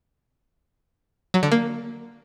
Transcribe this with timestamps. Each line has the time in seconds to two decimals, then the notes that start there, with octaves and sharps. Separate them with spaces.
1.34 F#3
1.43 D3
1.52 A#3